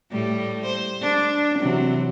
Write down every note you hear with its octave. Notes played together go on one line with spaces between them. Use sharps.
A2 G3 A3
C5
D4
C3 E3 F#3